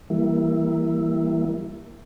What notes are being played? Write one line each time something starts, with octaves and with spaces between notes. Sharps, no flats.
E3 G3 A#3 E4